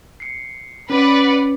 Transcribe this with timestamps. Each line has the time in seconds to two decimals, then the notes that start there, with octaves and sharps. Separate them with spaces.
0.20 C7 C#7
0.90 C#4 B4 D5 F#5